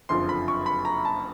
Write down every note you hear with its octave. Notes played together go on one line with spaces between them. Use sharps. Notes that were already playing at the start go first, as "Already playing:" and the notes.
F#1 F2 D3 F3 C6
B5
C#6
B5
A#5
A5